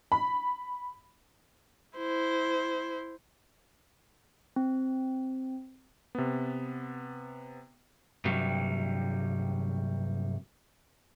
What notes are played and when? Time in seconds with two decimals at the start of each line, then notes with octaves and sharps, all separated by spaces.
0.12 B5
1.97 E4 C5
4.56 C4
6.15 C3 B3
8.25 G2 C3 F#3 G3